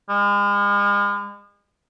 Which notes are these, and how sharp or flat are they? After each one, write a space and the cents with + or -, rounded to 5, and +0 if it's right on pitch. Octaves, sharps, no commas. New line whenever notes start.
G#3 -40